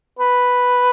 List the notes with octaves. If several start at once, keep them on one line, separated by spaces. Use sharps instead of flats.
B4